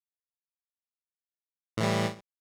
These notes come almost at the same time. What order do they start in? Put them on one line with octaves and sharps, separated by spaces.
A2 E3 G3